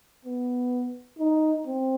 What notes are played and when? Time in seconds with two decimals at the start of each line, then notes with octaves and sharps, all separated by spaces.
0.25 B3
1.19 D#4
1.66 C4